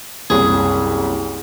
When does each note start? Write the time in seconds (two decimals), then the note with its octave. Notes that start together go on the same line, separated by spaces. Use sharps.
0.30 F#1 C2 G#4